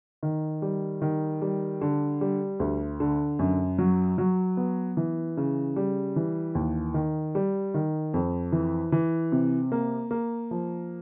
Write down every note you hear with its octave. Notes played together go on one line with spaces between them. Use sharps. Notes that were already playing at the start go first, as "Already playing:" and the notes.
D#3
G3
D#3
G3
D3
G3
D2
D3
F#2
F#3
F#3
B3
E3
C#3
G3
E3
D#2
D#3
G3
D#3
F2
E3
E3
C3
A#3
A#3
F3